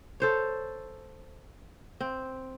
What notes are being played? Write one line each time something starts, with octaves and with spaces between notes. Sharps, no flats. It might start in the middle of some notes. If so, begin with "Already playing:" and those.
A4 C5 C#5
C4